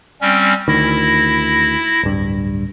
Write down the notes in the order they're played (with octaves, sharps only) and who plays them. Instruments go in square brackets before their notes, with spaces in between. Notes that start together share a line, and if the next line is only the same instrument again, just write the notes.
[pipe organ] G3 C4 C#4
[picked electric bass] D2 D#3 [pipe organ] E4 A#6
[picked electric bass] D1 G2